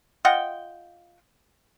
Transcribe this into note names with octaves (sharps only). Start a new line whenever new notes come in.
F4 D#5 F#5 G5